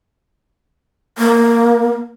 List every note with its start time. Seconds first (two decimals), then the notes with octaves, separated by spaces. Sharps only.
1.18 A#3